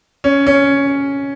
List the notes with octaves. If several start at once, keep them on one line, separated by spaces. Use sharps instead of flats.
C#4
C#4